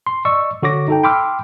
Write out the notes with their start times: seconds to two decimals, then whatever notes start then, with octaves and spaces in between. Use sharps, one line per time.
0.07 C6
0.25 D5 D#5 C#6 E6
0.63 D3 F#4 C#5 D6 A#6
0.88 D#4 A4 G5
1.03 G5 B5 C6 D6 E6 F6